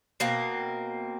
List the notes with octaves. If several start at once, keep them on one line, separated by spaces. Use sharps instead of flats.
B2 A#3 C4